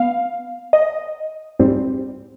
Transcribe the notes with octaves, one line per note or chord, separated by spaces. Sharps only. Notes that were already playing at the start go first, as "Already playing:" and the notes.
Already playing: B3 F5
D#5
G#2 G3 C4